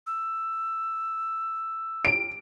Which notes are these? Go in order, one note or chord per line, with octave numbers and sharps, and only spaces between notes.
E6
D7